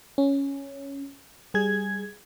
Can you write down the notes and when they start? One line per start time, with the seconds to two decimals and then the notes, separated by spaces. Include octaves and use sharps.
0.18 C#4
1.54 G3 G#4 G#6